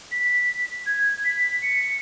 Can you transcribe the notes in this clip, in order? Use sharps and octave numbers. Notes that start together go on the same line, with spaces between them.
B6
G#6
B6
C#7